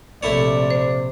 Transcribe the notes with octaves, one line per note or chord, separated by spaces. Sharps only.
A#1 C3 A3 E4 C#5 D5
C5